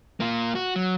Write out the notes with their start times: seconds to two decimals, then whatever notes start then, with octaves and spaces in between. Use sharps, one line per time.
0.20 A#3 F4
0.55 F#4
0.76 F#3